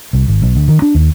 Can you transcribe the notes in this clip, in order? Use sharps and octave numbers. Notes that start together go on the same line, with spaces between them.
C2
G#1
B1
D2
D#3
D4
D#2